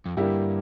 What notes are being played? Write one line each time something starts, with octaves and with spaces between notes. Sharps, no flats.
F2
G2 D3 G3 A#3 E4 G4